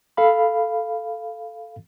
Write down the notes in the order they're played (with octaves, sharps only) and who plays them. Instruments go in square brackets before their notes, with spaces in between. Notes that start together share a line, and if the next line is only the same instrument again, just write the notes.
[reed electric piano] A4 F5 B5